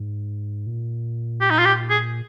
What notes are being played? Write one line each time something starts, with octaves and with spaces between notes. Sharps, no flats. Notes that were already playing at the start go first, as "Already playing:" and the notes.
Already playing: G#2
A#2
G4
D#4
F4
G4
G#4